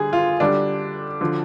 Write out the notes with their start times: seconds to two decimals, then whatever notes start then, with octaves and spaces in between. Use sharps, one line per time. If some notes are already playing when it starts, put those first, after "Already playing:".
Already playing: D3 G3 G#4
0.13 F4
0.40 D3 G3 D4
1.21 D3 F3